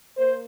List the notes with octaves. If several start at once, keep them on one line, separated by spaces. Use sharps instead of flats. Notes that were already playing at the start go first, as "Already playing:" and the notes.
A#3 C5